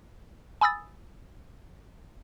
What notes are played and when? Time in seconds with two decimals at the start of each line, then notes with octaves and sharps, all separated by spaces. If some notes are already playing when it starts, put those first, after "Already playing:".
0.61 G#5 B5 D#6 E6 A6